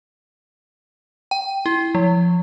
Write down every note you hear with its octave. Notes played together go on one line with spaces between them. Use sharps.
G5
E4
F3